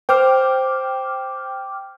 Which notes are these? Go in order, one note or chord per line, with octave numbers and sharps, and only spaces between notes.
C5 G5 D6 F6